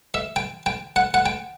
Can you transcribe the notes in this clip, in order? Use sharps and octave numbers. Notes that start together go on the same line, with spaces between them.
E5
G5
G5
F#5
F#5
G5